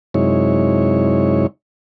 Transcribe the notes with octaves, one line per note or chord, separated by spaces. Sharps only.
F#2 C3 G#3 D#4 E4 C#5